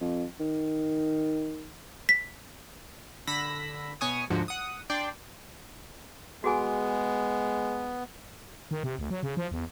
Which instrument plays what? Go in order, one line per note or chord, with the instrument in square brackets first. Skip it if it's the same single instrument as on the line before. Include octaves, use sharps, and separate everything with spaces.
[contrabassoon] F2
D#3
[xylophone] B6
[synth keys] D3 B5 E6 A#6 B6
B2 B3 C#5 G#5 C#6 D#6
D2 G#2 D3 F3 F#4
F#5 D#6
D4 D5 G5 C6
[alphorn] G#3 [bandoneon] B3 [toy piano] F#4 G#4 G#5
[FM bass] D#3
C3
D2
F#3
C#3
F3
E2